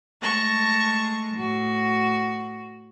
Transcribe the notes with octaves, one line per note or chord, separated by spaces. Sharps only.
G#3 A3 A5 C#6 A#6
A2 F#4